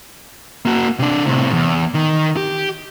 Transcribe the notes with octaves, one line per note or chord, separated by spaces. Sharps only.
A#3 F#4
C3 D4
A2 C3
E2
D#3
G4